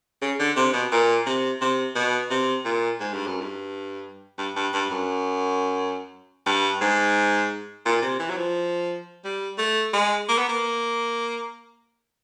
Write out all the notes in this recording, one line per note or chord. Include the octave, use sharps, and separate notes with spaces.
C#3
D3
C3
B2
A#2
C3
C3
B2
C3
A#2
G#2
G2
F#2
G2
G2
G2
G2
F#2
G2
G#2
A#2
C3
E3
F#3
F3
G3
A3
G#3
A#3
B3
A#3